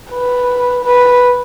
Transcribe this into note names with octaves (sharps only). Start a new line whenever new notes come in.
B4
B4